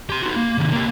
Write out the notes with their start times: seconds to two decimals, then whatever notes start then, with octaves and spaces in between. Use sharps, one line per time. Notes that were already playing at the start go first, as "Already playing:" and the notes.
0.09 G4 C6
0.23 D#4 F#4
0.36 A#3
0.58 C3 D#3
0.72 A#3 G4